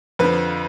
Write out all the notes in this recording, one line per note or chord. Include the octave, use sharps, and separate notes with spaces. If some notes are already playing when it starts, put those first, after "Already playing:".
F2 D3 F3 B4